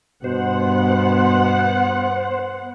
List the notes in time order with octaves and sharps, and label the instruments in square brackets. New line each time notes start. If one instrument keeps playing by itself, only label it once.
[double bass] G2 [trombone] B2 [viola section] B3 F#5 [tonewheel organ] C5